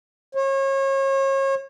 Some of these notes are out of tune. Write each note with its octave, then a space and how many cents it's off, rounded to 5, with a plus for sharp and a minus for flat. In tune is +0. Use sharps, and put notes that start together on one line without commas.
C#5 -35